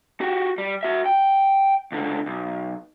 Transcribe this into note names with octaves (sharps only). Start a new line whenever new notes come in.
F#4 G4
G3
F#4 E5
G5
C#2 D3
B1